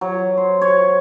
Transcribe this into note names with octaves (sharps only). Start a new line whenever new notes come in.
F#3
C5
C#5